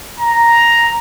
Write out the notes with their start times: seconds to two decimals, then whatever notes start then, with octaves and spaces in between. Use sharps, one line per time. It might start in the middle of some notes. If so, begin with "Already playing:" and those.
0.20 A#5